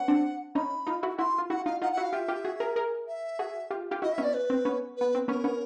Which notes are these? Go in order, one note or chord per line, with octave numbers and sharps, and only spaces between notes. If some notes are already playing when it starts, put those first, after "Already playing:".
Already playing: B3 C#4 F#5
C4 D4
C#4 D#4 B5
D#4 F4
E4 F#4
E4 F#4 C6
F4
E4 F#4 F#5
D#4 F4 F5
D#4 F4 F#5
F#5
E4 F#4
F5
F4 G4 E5
F4 G4
F#4 G#4
G#4 A#4
G#4 A#4
E5
F#4 G#4
F4 G4
F4 G4
E4 F#4 D#5
E5
B3 C#4
D5
B4
C4
B3 C#4
B3 B4
C4
B3 C#4 A#4
B3 C#4